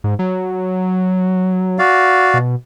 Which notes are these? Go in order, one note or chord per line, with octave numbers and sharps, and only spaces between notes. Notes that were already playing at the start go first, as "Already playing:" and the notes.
G#2
F#3
F#4 D5 F5
B2